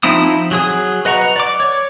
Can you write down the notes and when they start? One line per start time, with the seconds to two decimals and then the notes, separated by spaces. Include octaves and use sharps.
0.03 F3 C4 D#4 E4 D#6
0.51 F#3 G#4 D#6
1.05 B4 D#5 F#5 A#5 C#6
1.36 D5 D6
1.60 C#5